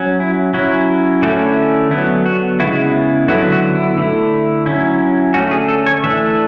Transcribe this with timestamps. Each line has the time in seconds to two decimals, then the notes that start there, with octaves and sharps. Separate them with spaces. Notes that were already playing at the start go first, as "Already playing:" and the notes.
Already playing: F#3 C#4
0.20 E4
0.54 F#3 C#4 E4 F#4
1.22 D3 A3 C#4 E4 F#4
1.91 D3 F#3 B3 E4
2.26 F#4
2.60 C#3 G#3 B3 E4 F#4
3.28 D3 F#3 B3 E4 F#4
3.52 F#4
3.75 E4
3.98 D3 A3 E4
4.66 F#3 C#4 E4
5.34 D3 A3 C#4 F#4
5.51 G#4
5.68 A4
5.86 C#5
6.04 E3 A3 D4 E5